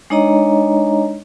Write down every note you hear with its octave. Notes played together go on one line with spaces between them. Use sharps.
G#3 D4 D#4 C#5 D#5 A#5